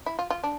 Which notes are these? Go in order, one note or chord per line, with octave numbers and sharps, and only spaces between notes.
E4
F4
F4
D4